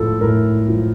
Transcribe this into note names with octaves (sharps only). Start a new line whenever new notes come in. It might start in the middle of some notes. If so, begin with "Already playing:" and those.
Already playing: A2 F3 F4 A4
A2 A#4
F3